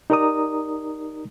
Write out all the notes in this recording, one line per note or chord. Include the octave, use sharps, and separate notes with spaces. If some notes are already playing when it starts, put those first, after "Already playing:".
D#4 G4 A#4 D5 A#5 D#6